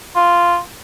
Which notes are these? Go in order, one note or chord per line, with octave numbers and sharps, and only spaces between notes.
F4